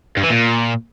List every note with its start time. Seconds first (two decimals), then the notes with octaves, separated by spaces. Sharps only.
0.17 G2
0.24 E3
0.30 A#2